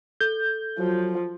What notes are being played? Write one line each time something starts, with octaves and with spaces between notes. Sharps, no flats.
A4 G6
F3 F#3